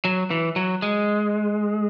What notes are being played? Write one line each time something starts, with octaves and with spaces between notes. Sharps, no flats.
F#3
E3
F#3
G#3